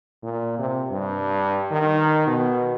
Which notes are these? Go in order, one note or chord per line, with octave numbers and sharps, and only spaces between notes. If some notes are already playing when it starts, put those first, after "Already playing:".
A#2
C3
G2
D#3
B2